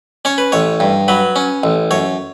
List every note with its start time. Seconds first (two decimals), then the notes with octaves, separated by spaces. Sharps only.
0.25 C#4 C#5
0.38 B4
0.52 A1 C#5
0.80 G2
1.08 F#3 B4
1.36 C#4
1.63 A1
1.91 F#2 C#5